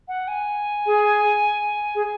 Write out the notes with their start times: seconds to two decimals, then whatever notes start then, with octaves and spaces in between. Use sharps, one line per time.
0.08 F#5
0.28 G#5
0.86 G#4
1.95 G#4